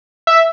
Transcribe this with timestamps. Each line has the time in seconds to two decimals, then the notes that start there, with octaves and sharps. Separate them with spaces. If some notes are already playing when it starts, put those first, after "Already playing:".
0.27 E5